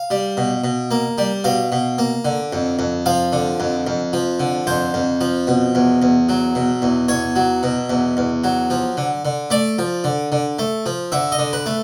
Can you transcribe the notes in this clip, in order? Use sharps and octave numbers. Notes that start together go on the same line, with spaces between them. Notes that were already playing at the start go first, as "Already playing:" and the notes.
Already playing: F5
G3
B2
B2
A#3
G3
B2 F5
B2
A#3
D3
F2
F2
F3 F5
D3
F2
F2
F3
D3
F2 C5
F2
F3
B2
E2
E2
F#3
B2
E2
E2 C#5
F#3
B2
E2
E2
F#3
F3
D3
D3
A3 D5
F3
D3
D3
A3
F3
D3 E5
D#5
D3
B4
A3